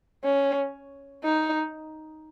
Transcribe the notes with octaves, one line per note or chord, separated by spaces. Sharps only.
C#4
D#4